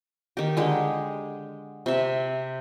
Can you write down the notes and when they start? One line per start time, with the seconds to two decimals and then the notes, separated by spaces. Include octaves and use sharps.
0.37 D#3 G4
0.57 D3 G#3 G4
1.86 C3 E5